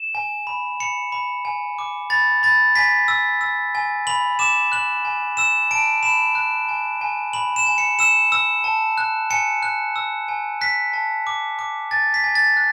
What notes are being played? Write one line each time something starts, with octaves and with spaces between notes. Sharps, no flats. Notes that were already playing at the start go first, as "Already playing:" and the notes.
Already playing: E7
G#5
B5
B5 C#7
B5
G#5
D6
B5 A6
B5 A6
G#5 B6
E6
E6
G#5
B5 F#7
D6 E7
F#6 F#7
G#5
E6 E7
A5 D7
B5 E7
F#6
G#5
G#5
B5 F#7
E7
G#5
C#7
E6 E7
E6
A5
F#6
G#5 C#7
F#6
E6
G#5
F#6 B6
A5
D6
D6
G#5 A6
B6
G#5
A6
F#6